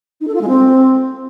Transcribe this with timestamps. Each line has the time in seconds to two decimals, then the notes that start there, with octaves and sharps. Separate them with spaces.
0.20 D#4
0.27 A4
0.34 F4
0.41 G#3
0.48 C4